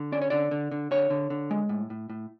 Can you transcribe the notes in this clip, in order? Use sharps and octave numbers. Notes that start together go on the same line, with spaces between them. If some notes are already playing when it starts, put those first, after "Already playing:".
Already playing: D3
C#4 D5
C#5
D3 D5
D3
D3
D3 C#5
D3
D3
G#3
A2
A2
A2